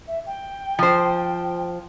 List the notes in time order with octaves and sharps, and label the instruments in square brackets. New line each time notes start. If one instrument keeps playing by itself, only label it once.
[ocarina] E5
G5
[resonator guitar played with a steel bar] F3 C5